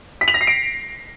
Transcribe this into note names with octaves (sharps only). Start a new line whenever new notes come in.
B6
F7
A#6
C7
D7